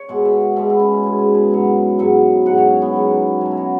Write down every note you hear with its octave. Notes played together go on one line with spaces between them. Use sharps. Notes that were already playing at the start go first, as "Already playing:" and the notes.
Already playing: C#5
B2 G#3 F#5
E5
F#5
B2 G#3 E5
E4
C#4
B2 G#3 E4
G#4
B4
G#2 F#3
G#2 F#3
G#2 F#3 F#5
C#5
C#4
B3
G#2 F#3
B2 F#3 C#4
E4
F#4